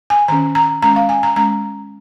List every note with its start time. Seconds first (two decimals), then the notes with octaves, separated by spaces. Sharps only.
0.10 G#5
0.28 D#3 C#4 A#5
0.55 A#5
0.82 G#3 C#4 A#5
0.96 F5
1.09 G#5
1.23 A#5
1.36 G#3 C#4 A#5